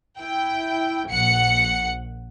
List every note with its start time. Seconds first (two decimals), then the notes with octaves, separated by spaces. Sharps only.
0.17 E4 G5
1.09 A#1 F#5 C#7